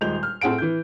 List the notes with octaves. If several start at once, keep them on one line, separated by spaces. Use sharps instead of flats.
D#1 G#3 G6 F7
F6
A2 C4 G#4 F#5 D7
E3 G6